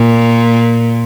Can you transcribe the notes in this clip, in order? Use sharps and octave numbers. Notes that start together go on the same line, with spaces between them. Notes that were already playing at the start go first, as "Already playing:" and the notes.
Already playing: A#2